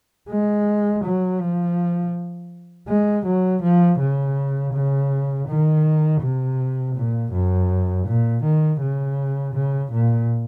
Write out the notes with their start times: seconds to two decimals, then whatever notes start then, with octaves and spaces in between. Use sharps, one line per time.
0.30 G#3
1.04 F#3
1.40 F3
2.88 G#3
3.26 F#3
3.63 F3
4.00 C#3
4.74 C#3
5.48 D#3
6.22 C3
6.96 A#2
7.33 F#2
8.07 A#2
8.43 D#3
8.81 C#3
9.54 C#3
9.92 A#2